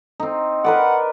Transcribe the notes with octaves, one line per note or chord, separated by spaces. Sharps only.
C4 D#4
A#4 B4 D5 F#5